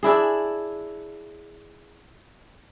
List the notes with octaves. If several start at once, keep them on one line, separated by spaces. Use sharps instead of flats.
D4 E4 G#4